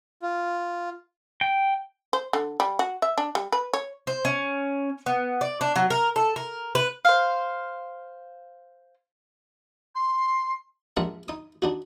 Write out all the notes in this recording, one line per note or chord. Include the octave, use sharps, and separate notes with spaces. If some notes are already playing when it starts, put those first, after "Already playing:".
F4
G5
C5
D3
G3
F#4
E5
D4
G3
B4
C#5
C5
C#4
B3
D5
D4
F#3
A#4
A4
A#4
B4
C5 F5
C6
A#1 G#3 D4 A#4 E5 F#5
D#4 D#6
D4 D#4 F#4